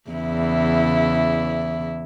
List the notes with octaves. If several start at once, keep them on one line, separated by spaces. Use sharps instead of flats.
E2 C#3 E4